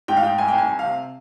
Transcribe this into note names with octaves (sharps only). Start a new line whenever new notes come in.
G#2 G5
F5
G#2 G5
C2 G#5
G5
C2 G#5
C2
C3 F5